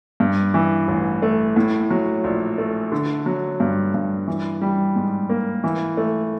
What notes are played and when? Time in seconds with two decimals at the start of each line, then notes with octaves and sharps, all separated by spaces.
0.20 G2
0.54 E3
0.88 A1
1.22 A3
1.56 A2
1.90 F#3
2.24 A#1
2.58 A3
2.92 D3
3.26 F#3
3.60 G2
3.94 G2
4.28 E3
4.62 G3
4.96 G#2
5.29 A#3
5.64 E3
5.97 A3